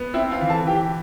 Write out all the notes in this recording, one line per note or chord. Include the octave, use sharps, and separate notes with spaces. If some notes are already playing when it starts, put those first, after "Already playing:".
Already playing: B3
C4 E4 E5
F4 F5
E3
A4 A5
E3 G4 G5